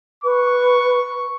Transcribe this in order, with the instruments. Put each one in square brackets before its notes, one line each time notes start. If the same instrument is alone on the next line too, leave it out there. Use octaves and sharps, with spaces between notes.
[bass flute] B4 [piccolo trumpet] C#6